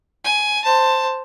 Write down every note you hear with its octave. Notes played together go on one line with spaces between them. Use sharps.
G#5
C5 A5